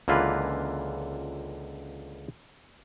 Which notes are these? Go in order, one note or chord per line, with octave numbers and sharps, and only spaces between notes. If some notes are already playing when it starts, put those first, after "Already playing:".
C#2 D3 E3 A#3 F4 B4